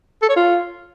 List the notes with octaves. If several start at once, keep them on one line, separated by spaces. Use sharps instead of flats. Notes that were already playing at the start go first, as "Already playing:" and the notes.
A4
C#5
F4